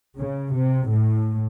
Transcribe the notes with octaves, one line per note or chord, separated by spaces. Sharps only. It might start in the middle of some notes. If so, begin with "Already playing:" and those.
C#3
C3
A2